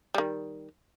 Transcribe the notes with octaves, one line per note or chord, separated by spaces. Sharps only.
D#3 G3